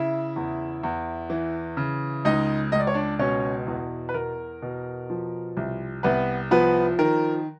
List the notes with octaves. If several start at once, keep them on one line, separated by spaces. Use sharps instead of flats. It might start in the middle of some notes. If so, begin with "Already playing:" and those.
Already playing: C#3 E4 E5
E2
E2
E3
C#3
C#2 D#4 D#5
C#2 D#5
D5
C#5
D4 D5
B2 C#4 C#5
E2
B4
E2 A#4
B2
F3
C2
C2 B3 B4
F3 B3 B4
D#3 A#4